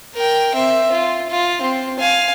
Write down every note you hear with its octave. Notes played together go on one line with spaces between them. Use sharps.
A#4 G5
C4 E5
F4
F4
C4
F5 G#5